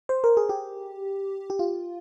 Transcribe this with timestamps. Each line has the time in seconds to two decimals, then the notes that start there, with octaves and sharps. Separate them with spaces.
0.09 C5
0.24 A#4
0.37 G#4
0.49 G4
1.50 G4
1.59 F4